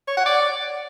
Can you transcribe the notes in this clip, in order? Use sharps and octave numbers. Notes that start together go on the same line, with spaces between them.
C#5
F#5
D5